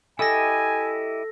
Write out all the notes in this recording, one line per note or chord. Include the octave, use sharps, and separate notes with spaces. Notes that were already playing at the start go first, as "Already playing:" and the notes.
E4 G4 A4 D#5 G#5 E6 A#6